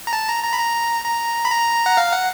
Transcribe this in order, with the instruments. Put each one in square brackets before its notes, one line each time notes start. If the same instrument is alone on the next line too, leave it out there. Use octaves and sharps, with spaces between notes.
[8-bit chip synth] A#5
A5
A#5
A#5
B5
A#5
A#5
B5
A#5
F#5
F5
F#5